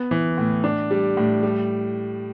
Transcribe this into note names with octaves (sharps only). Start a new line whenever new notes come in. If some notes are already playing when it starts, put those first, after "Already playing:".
Already playing: B3
E3
A2
D4
G3
A2
G3